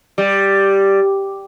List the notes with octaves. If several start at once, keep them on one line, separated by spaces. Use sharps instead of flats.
G3